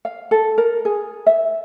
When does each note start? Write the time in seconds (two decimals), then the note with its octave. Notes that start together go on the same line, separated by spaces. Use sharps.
0.05 F5
0.31 A4
0.58 A#4
0.85 G#4
1.26 E5